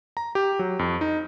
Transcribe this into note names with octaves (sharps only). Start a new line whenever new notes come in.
A#5
G4
F#3
F2
D#4